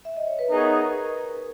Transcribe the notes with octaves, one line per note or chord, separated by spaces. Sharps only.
E5
D#5
C#5
B4
B3 D#4 G#4 A#4 C#5